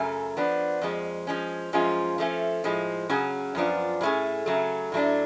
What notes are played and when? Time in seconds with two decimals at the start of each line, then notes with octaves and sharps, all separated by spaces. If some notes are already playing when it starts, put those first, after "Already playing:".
Already playing: F#2 C#3 F#3 A3
0.37 F3 B3 D4
0.81 F2 F3 G#3
1.27 F3 G#3 C#4
1.73 F#2 F3 G#3 C#4 F4
2.18 F3 A3 C#4
2.64 A2 F3 G#3
3.09 C#3 F#3 C#4 G#4
3.55 F#2 F3 B3 D4 F4
4.01 A2 F#3 A3 C#4 G#4
4.46 C#3 F#3 A3
4.92 A2 F#3 A3 D4